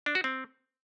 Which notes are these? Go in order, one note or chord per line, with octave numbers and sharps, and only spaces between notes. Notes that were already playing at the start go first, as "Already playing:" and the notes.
D4
F#4
C4